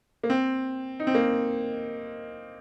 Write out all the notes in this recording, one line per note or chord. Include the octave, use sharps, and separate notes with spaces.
A#3
C4
D#4
C4
A#3